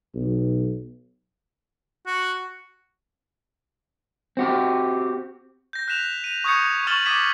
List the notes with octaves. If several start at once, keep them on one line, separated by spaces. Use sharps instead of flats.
B1
F#4
C4 F#4 G4
G6 A#6
F#6 B6 E7 F7
D#7 F7
C#6 D#6 G6 G#6 C#7
C#6 F6 A6 E7 F#7 G7
D6 D#6 G#6 B6 D#7 E7